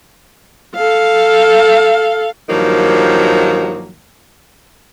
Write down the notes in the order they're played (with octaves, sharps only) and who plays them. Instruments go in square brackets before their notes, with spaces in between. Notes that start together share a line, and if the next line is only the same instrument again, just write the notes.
[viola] A4 F5
[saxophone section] G2 D#3 F3 F#3 A#3